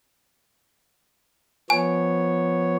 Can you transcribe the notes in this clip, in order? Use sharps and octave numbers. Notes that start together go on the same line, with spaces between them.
F3 B3 C#5 G#5